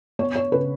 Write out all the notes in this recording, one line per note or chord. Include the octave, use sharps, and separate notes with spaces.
B3 C#5
C#5
C#3 B4